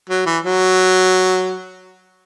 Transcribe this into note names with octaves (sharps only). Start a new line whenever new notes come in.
F#3
E3
F#3